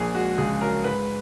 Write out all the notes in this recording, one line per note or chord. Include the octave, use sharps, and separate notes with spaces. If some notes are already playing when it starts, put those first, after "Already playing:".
Already playing: A#1 A#3 G#4
G#3 F#4
C#2 G#4
F#3 A#4
G#2 B4